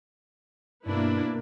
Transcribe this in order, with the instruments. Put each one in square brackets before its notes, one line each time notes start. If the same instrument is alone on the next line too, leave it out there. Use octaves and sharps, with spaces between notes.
[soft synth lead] G2 [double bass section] B2 A#3 [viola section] D4 E4 B4